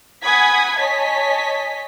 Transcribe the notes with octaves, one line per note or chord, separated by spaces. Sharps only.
F#5 G#5 B5 D#6 G#6 B6
C#5 D#5 G#5 A5 B6